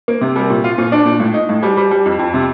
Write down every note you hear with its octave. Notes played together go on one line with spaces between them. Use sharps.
A#3
C3
G3
A#2
F4
A#2
D4
A#2
A2
D#4
A2
G3
G3
G3
F2
F2
C3